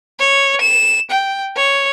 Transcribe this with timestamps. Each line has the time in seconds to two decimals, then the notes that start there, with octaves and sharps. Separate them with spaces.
0.20 C#5
0.62 E7
1.11 G5
1.57 C#5